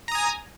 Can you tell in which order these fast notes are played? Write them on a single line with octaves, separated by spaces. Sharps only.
A#5 D#6 G#5